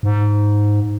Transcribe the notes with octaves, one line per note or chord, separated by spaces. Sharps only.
G#2